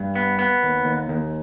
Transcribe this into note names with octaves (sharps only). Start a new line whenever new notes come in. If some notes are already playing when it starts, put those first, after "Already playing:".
Already playing: G2
B3
B3
D#2
D#2
D#2